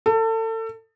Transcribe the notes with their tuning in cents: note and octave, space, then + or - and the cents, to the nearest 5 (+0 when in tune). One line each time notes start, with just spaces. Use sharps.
A4 +30